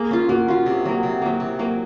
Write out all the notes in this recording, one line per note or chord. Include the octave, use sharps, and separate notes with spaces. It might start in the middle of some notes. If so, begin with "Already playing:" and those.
Already playing: A#3 G#4
C#4 F4
A#3 F#4
C#4 F4
C3
F#3 A#3
C3
F#3 A#3
C3
F#3 A#3